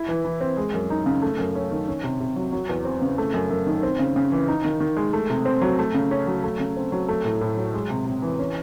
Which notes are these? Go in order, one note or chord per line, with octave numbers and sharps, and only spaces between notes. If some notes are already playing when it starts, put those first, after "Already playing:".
Already playing: E4
E3
E3
C4
G#3
F#2
D#4
C#3
A3
F#2
C#4
D#3
C#4
C3
C3
F#3
F#3
E2
C4
C#3
A3
F#2
F#2
D#3
C4
C#3
C#3
E3
D#4
D#3
D#3
G#3
A3
C3
C4
F#3
A3
C#3
C#4
F#3
A3
C#3
C4
F#3
A3
A2
A2
F#3
G#3
C3
C3
E3
C#4